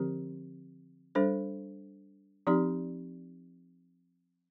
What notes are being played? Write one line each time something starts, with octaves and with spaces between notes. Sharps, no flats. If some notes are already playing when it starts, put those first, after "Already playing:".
Already playing: D3 F3 C4 G4 A#4
G3 D4 A4 C5
F3 C4 D#4 G4 D5